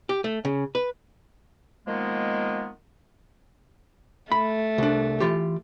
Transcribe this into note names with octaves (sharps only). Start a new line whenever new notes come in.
G4
A3
C#3
B4
D#3 F3 G#3 A#3 B3
A3 B5
C2 D4
E3 F4 G4